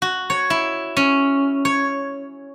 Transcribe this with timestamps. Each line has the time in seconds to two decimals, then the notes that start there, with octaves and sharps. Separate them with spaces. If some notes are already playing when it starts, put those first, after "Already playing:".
0.02 F#4
0.30 C#5
0.50 E4
0.97 C#4
1.65 C#5